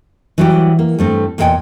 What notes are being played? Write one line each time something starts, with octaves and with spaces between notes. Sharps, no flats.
E3 F#3 G3 E4 F#4 G4
A#3
G2 A3 C4
E2 A#2 A#4 D#5 G5 G#5